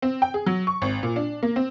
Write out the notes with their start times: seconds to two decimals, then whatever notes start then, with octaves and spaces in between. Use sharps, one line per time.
0.02 C4
0.22 G5
0.34 G#4
0.46 F#3
0.67 C#6
0.82 G#1
1.03 A#2
1.16 D4
1.43 A#3
1.56 C4